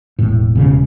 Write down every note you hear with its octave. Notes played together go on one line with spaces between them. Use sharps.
E1 A2
E1 C#3